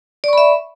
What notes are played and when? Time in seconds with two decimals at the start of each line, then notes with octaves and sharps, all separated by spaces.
0.24 D5
0.28 C#6
0.33 B5
0.38 E5